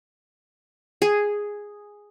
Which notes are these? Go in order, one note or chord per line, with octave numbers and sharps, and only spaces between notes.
G#4